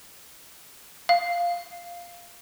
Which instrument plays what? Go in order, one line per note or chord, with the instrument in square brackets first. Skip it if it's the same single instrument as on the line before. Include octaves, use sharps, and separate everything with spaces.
[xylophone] F5